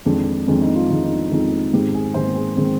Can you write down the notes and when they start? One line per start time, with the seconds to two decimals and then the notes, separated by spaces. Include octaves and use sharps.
0.05 F2 D#3 G#3 D4
0.47 F2 D#3 G#3 D4
0.61 D#4
0.75 F4
0.89 F2 D#3 G#3 D#4
1.03 D#4
1.10 D4
1.31 F2 D#3 G#3 D#4
1.73 G#2 D#3 G#3 C4 G4
1.94 G#4
2.14 G#2 D#3 G#3 C4 C5
2.36 G#4
2.57 D#3 G#3 C4